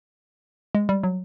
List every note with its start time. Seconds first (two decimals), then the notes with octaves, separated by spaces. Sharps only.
0.75 G#3
0.89 G3
1.03 F#3